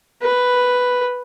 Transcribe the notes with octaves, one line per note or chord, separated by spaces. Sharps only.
B4